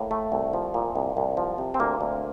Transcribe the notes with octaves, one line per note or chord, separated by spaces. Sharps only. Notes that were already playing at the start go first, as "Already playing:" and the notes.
Already playing: A2 A#3
A3
C2
F3
A#2
C2
C2
F3
C3
C4
D2 A#3
D2